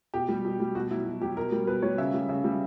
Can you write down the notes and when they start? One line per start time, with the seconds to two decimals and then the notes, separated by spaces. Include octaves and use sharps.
0.14 B2 G4
0.29 G3
0.45 B2
0.60 G3
0.75 B2 F#4
0.91 F#3 E4
1.06 B2
1.21 F#3 G4
1.37 B2 A#4
1.52 G3
1.67 B2 B4
1.82 G3 C#5
1.98 C#3 E5
2.14 G3
2.29 C#3
2.44 G3